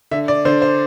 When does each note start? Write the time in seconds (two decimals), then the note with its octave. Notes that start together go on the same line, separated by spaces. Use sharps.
0.11 D3 E5
0.28 D5
0.45 D3 C5
0.62 C5